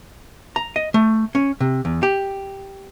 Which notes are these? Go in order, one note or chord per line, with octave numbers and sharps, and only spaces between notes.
A#5
D#5
A3
C#4
C3
E2
G4